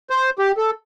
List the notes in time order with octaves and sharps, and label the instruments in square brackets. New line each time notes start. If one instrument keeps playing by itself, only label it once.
[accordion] C5
G4
A4